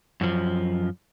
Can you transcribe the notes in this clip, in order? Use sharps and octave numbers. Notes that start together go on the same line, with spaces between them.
F#2 F3